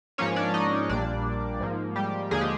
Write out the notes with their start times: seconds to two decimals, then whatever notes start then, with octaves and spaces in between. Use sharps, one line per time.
0.18 G#2 F3 A#3 C#4 C#5
0.36 D4 D5
0.54 D#4 D#5
0.89 A#1 A#2 G3 A#3 D4 D5
1.60 G#2 F3 A#3
1.96 G3 G4
2.31 D#2 D3 F3 G#3 A#3 G#4
2.41 G4